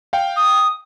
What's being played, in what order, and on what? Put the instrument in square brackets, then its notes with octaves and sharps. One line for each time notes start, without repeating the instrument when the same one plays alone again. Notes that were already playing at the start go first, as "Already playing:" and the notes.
[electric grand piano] F5 G5
[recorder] D#6